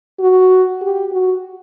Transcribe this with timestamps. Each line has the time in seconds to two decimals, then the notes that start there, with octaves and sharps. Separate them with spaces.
0.20 F#4
0.82 G4
1.12 F#4